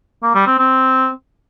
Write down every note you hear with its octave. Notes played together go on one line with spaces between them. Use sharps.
A#3
G3
C4
C4